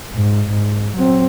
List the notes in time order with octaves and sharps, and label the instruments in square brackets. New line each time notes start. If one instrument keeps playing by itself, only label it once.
[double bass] G#2
G#2
F#3 C4